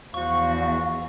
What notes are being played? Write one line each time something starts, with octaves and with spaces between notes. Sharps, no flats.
E2 F3 F#4 C5 F5 C#6